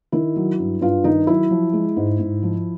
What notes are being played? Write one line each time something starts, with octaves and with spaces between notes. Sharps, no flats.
D#3 E4
F#3
G2
G2 F4
D#3 D#4
F#3 E4
F3
G#3
G#2
G#2
F3